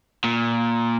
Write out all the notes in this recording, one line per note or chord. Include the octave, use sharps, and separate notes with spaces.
A#2